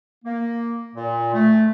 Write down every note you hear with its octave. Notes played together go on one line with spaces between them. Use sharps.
A#3
A#2
A3